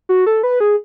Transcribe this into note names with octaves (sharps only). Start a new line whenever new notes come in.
F#4
A4
B4
G#4